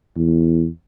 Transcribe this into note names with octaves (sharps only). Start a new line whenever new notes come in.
E2